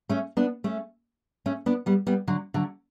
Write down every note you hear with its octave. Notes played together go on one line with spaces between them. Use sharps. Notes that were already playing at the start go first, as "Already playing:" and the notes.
A3 C#4
B3 D4
A3 C#4
A3 C#4
B3 D4
G3 B3
G3 B3
D3 F#3
D3 F#3